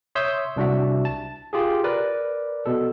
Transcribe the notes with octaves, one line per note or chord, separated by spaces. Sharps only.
C#5 E5 C6 D#6 E6 G6
C2 D4 F#4 E5
A5
F4 G4 G#4
A#4 B4 D5
B2 A4